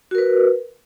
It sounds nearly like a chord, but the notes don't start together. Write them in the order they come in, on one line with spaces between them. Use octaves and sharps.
F#4 A#4 B4